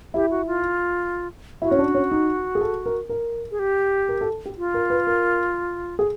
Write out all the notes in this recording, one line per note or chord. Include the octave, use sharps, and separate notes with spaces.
E4 G4
F#4
F4
E4 F#4
C#4
D4
C#4
D#4
G#4
A4
A#4
A#4
G#4
G4
A#4
A4
G4
F4
A#4
B4
A#4
G#4